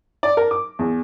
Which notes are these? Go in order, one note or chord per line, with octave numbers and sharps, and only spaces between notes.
D5
A#4
D6
E2